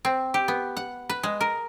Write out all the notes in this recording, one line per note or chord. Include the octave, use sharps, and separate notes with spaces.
C4
G4
B3
F#5
B4
G#3
A#4